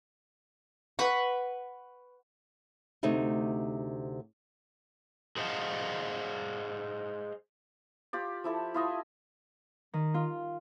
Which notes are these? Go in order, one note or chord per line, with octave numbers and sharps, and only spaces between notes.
B4 F#5 B5 C#6
D2 C3 A3 D#4
G#4 C5 D#5 F5 F#5 A5
F4 G4 D5
F3 E4 A4
E4 F4 D#5
D#3
F4